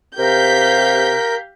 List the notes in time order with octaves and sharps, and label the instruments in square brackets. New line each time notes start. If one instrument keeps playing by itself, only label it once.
[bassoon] C3 [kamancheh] G4 F5 [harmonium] A#4 [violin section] G6 B6